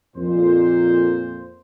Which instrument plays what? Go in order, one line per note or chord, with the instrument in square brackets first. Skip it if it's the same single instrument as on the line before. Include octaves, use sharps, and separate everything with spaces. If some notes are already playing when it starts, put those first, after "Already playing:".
[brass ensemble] F2 A#2 C5